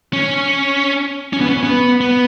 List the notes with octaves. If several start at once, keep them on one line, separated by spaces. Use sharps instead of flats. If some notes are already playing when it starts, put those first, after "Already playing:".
C#4
C#4
B3
C#4
B3
B3